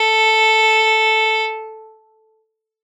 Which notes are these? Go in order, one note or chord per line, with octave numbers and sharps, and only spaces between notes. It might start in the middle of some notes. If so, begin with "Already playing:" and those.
Already playing: A4